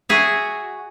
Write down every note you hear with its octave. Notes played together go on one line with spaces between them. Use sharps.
F#4 G#4 E5